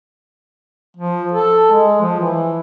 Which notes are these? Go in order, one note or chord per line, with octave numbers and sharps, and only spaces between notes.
F3
A4
G#3
F3
E3